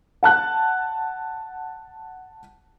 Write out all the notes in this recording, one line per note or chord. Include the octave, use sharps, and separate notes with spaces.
F#5 A5 F#6